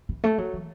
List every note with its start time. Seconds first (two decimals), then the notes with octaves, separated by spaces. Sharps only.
0.09 E3
0.24 A3
0.38 F#3
0.53 E3